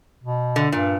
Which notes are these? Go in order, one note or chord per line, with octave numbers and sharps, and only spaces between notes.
B2
D3
G2 A#2